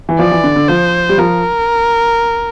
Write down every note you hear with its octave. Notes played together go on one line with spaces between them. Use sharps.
E3
F3 D5
E3
D3
D3
F3 C5
G3
F3 A#4